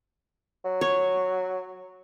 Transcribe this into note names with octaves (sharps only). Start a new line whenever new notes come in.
F#3
C#5